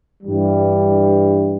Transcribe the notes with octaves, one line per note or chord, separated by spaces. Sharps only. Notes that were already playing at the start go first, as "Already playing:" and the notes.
G2 E3 G3